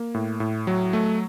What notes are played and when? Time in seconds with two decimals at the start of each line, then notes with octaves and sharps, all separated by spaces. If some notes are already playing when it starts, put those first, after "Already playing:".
Already playing: A#3
0.14 A2
0.40 A2
0.67 F#3
0.93 A3